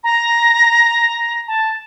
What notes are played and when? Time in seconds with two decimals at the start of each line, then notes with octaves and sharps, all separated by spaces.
0.04 A#5
1.47 A5